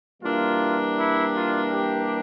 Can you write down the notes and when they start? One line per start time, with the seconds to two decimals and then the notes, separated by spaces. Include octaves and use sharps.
0.22 E3 G3 A#3 D4 F4
0.97 E4
1.35 F4
1.72 G4